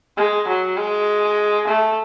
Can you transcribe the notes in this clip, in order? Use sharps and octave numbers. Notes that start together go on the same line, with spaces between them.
G#3
F#3
G#3
A3